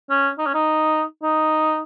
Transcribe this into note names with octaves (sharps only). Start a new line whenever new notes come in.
C#4
D#4
C#4
D#4
D#4